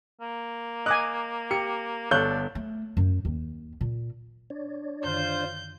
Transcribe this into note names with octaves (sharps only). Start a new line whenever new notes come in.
A#3
D#5 G#5 D6 F#6
G4 C#7
G1 D4 A4 C#5 F5 F#6 G6
A3
F#2
D#2
A#2
D4 C#5 D5
F#2 D3 D#3 F4 C5 G6